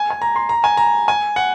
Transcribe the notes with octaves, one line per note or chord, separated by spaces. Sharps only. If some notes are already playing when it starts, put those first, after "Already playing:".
Already playing: G#5
G#5
A#5
C6
A#5
G#5
A#5
G#5
F#5